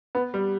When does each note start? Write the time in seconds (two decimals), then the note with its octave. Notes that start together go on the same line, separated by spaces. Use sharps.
0.15 B3
0.34 G3